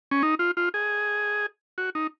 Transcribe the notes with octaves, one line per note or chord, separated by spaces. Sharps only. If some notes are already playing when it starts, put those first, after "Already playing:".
C#4
D#4
F4
F4
G#4
F#4
D#4